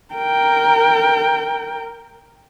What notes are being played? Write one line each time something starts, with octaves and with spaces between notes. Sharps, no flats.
A#4 G5